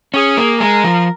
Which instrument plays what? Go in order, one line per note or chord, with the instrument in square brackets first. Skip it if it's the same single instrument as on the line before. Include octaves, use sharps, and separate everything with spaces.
[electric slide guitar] C#4 [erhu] G#4
[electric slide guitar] A#3
[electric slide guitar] G#3 [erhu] A#4
[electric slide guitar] F3